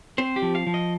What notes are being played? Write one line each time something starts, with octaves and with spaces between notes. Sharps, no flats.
C4 C5
G4
F3
F5
F3
D#5